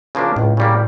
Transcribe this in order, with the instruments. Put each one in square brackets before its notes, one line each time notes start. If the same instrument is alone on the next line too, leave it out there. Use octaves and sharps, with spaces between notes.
[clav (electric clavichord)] C#3 F3 A#3 D4
[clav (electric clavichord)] C#2 [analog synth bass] A2
[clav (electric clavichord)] C#3 G3 A#3